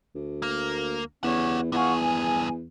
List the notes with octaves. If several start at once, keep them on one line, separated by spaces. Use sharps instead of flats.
D2
A#3 A#4
E2 C#4 G4 F#5
E2 G2 F4 G#4 F#5 C#6
G#5